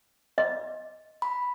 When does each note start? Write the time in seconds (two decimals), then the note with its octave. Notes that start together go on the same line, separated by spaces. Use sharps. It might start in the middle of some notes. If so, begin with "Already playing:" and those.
0.38 D#5
1.22 B5